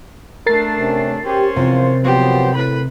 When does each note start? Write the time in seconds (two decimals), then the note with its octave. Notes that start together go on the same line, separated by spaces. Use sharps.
0.46 A3 D4 A#4 A6 C7
0.78 C3 C#4
1.25 C#4 G4 C5
1.56 E2 C3 F3 F4
2.04 F3 F#3 B3 G4 C5
2.55 A2 B4 B5